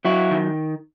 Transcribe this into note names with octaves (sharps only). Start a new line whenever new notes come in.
F#3 E4 F#4
D#3